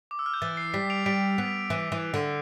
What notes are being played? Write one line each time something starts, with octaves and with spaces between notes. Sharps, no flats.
D6
E6
F6
G6
E3 A6
C7
G3 B6
D7 F7
G3 B6 D7
B3 B6
E3
E3
D3